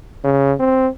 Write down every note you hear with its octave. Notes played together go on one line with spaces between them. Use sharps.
C#3
C4